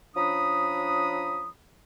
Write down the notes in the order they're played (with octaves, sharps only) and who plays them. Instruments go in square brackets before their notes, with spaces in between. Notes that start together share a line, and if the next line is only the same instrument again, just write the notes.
[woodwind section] F3 C#4 D4 A#5 B5 D#6